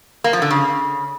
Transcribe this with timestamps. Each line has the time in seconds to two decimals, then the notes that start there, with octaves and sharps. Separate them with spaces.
0.24 A#3
0.33 F3
0.42 D3
0.51 C#3